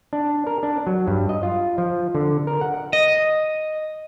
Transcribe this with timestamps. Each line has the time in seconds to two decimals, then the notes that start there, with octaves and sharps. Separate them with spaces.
0.13 D4
0.47 A#4
0.63 D4
0.87 F#3
1.08 G2
1.29 D#5
1.43 F4
1.78 F3
2.15 D3
2.47 A#4
2.61 F#5
2.93 D#5